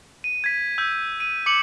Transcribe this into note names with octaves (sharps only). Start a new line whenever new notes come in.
D#7
G#6 B6
E6 G6
D#7
D6 C#7 F#7